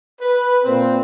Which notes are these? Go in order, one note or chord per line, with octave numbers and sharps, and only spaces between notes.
B4
A#2 A#3 C4